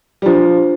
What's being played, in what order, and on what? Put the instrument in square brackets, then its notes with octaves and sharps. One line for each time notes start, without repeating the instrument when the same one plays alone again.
[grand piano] G3
[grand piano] F3 [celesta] D4 F4 C5